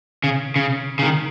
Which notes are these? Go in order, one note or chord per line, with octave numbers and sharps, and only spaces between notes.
C#3
C#3
C#3
D#3